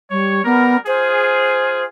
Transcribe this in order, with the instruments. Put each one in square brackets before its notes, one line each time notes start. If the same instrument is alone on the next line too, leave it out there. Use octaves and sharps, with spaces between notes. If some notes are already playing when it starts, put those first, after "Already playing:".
[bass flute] G3 [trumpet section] C#5
[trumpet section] G3 A#4 [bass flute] B3
[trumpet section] F4 G#4 [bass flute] C5